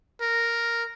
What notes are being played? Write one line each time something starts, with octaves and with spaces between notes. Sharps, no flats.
A#4